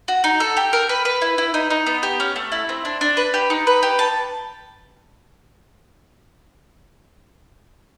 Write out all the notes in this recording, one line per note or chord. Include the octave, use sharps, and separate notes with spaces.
F#4
D#4
A4
G4
A#4
B4
B4
E4
E4
D#4
D#4
B3
G4
C#4
A3
E4
C4
D4
D4
B4
G4
D#4
B4
G4
A5